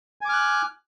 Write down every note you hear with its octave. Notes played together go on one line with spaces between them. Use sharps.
G#5 D6 F6 F#6